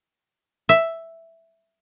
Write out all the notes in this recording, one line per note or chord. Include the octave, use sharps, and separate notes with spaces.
E5